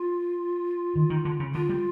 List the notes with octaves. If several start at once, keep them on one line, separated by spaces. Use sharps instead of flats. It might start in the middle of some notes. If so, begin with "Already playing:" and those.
Already playing: F4
D#3
D#3
D3
C#3
D3 F4
G3